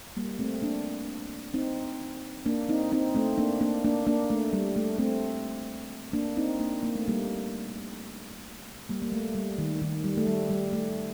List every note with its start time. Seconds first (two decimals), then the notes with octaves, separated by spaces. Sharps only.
0.17 G3 A#3
0.39 A3 C4
0.62 A#3 D4
1.54 C4 D#4
2.46 A#3 D4
2.69 C4 D#4
2.92 C4 D#4
3.15 A3 C4
3.38 A#3 D4
3.61 A#3 D4
3.84 A#3 D4
4.07 A#3 D4
4.30 A3
4.53 G3
4.76 A3
4.98 A3 C4
6.13 A#3 D4
6.37 C4 D#4
6.59 A#3 D4
6.83 A#3
6.95 A3
7.08 G3 A#3
8.89 G3 A#3
9.02 A#3
9.12 A3
9.35 G3
9.58 D#3
9.81 D#3
10.04 G3
10.18 A3
10.27 G3
10.50 G3
10.73 A3